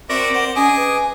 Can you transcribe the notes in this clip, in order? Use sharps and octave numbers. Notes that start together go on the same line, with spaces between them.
C4 F#4 A#4 C5 D5 E5
C5 F#5
C#4 G#4 D#5 G#5 D6
B4